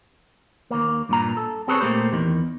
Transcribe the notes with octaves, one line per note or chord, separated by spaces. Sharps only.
D#2 A#3
G2 A#2 A#5
A4
C4 G#4 A4 B4 C#5
A#2 A3 A#3 G4 C5
E2 D#3